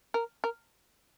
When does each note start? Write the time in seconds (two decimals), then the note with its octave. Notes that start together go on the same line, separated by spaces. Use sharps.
0.14 A#4
0.44 A#4